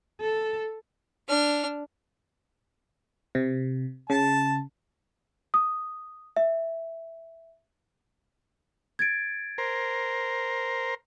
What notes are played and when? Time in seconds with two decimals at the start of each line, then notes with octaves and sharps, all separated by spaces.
0.21 A4
1.28 D4 F6
3.35 C3
4.10 C#3 A5
5.54 D#6
6.36 E5
8.99 G#6 A6 D7
9.58 A#4 C5